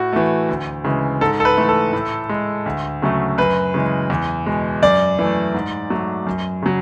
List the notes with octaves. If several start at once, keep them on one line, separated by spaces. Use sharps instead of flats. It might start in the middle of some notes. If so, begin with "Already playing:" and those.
Already playing: A2 F#4
E3 A3
D2
C#3 E3 G#3
G#2 A4
A4
B4
E3 A3
A4
A2
G#3
D2
C#3 F#3 A3
F#2 B4
C#3 E3 G#3
E2
B2 G#3
F#2 D5
E3 A3
G#2
F#3 A3
F#2
C#3 F#3